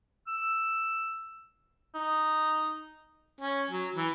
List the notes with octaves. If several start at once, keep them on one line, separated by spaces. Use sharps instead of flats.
E6
D#4
C#4
F#3
E3